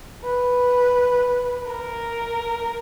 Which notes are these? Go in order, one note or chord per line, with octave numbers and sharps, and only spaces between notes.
B4
A#4